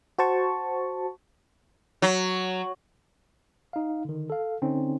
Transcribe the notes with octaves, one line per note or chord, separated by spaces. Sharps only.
F#4 C5 A5 C#6
F#3
D#4 F5
D3 D#3
A4 F5
D3 C4 C#4 D#4